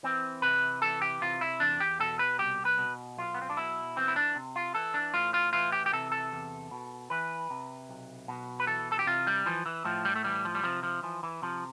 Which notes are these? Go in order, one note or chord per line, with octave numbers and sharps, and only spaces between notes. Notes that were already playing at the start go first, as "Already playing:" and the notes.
E3 C4
C3 B4
E3 A4
G4
C3 F4
E4
E2 D4
G4
B2 A4
B4
C2 G4
B4
B2
B1 F4
B3
C4
D4
B2 E4
E3 C4
E4
D4
C3
F4
E3 A4
D4
A2 F4
F4
E3 F4
G4
G4
C3 A4
A4
E2
B2
E3 B4
C3
B1
B2
B4
E3 A4
A4
G4
C3 F4
G3
E3 F3
E3
A2 F3
G3
A3
E3 G3
F3
G3
C3 F3
F3
E3 F3
E3
C3 F3